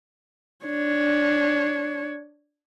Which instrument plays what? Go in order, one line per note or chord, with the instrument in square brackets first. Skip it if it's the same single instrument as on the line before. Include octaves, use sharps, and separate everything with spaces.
[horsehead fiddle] D4 C#5